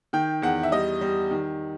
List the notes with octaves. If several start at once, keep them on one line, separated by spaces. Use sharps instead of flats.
D#3 G5
E2 F#5
E5
G3 D#5
G3
D#3